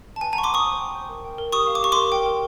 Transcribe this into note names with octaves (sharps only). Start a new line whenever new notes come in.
A5
B4 G#5
G#5 A#5
F#5 C#6
C6 D6
B4 C#6 D#6
C5
G5
C5
A#4
G5
A#4
G4 C#6 D#6
F5
D6
G4 C#6
A#4 C6 D6
G5
A#4